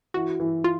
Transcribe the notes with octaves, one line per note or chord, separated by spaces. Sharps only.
E3 F#4
E3
F4